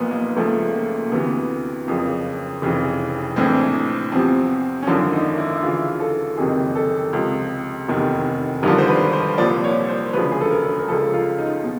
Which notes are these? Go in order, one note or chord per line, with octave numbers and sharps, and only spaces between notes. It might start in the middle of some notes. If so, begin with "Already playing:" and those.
Already playing: B1 A#2 F3 A#3 B3
A#3
C#2 C#3 F3 A3
A#3
A#3
D2 C3 E3 B3
F#1 F2 C#3 F3
F1 F2 C#3 E3
A#1 A2 E3 C4
E2 C3 F3 C4
C#4
G#1 F#2 D3 F3 D4
D#4
E4
E4
D2 C#3 E3 F4
A4
F#1 F2 C3 D#3 G#4
A4
C#2 C3 F3
F1 E2 C3 D#3
G#1 G2 D3 F3 A#4
C5
B4
C5
C2 A#2 F3 D5
C#5
C5
E1 D2 C#3 F3 B4
G#4
A4
A#4
A#4
C#2 C#3 F3 A4
F4
D#4
B2